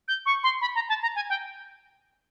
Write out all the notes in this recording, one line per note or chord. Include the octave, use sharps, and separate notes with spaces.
G6
C#6
C6
B5
A#5
A5
A#5
G#5
G5